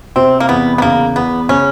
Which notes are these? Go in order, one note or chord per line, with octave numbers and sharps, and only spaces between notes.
C3 C4
A#3
E2 B3
B3
C#3 A#3
E2 B3
C#3 C#4